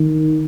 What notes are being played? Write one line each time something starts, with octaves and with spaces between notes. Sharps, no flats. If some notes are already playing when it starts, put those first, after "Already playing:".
Already playing: D#3